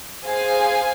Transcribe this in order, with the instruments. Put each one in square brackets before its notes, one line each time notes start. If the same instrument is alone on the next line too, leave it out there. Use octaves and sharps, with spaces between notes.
[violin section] G#4 C5 F5 G#5